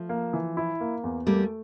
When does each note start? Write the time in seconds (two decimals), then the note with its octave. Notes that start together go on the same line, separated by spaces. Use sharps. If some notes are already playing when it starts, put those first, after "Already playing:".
Already playing: F3 A3
0.09 A#3
0.33 E3
0.57 E4
0.81 A#3
1.04 E2
1.26 G3 A3 A#3